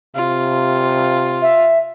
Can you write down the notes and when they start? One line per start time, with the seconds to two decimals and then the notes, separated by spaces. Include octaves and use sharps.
0.15 C3 F4
1.42 E5